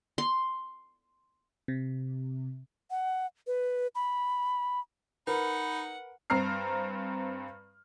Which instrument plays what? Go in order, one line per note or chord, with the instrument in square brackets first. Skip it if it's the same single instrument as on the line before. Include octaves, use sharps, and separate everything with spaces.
[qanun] C6
[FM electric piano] C3
[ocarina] F#5
B4
B5
[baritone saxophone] D#4 [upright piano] A#4 B4 [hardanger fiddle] F#5 [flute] B5
[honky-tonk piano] G2 C4 A#5 F6 C7